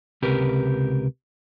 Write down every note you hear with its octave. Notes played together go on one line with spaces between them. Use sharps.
C#2 C3 G4 A#4 B4